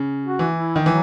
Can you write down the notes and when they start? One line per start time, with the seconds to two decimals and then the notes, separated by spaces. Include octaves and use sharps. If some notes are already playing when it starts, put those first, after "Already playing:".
Already playing: C#3
0.25 F#4
0.39 E3
0.55 E4
0.76 D#3
0.85 E3 F#3